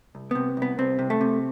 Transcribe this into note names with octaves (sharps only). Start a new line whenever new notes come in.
C2
C3 B3
C2 B3
C2 C4
C3
A3
C3